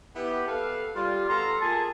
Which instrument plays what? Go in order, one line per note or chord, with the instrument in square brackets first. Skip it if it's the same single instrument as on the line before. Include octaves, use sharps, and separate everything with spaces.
[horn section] B3 E4 G4
A4 B4 F5
[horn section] G3 [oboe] F4
[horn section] B2 A4 A#5 [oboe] C6
[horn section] A#2 G#4 [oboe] A5